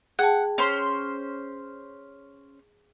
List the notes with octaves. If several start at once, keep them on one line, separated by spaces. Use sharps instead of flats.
G#4 F#5 G5 A5
C#4 C5 C6